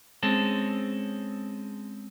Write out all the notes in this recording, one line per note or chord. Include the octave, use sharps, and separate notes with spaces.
G#3 C4 C#4 A4